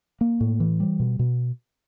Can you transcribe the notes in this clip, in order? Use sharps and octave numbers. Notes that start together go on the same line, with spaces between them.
A#3
A2
E3
G3
B2
B2